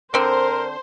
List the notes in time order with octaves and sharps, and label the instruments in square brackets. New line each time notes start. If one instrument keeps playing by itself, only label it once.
[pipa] D3 C4 [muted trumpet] A#4 [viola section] C5